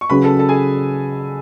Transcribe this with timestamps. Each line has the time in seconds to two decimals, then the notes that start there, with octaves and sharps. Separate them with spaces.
0.01 C#6
0.10 C#3 F#3 C#4 G#4 B4 B5
0.24 A4 A5
0.39 A4 A5
0.49 G#4 G#5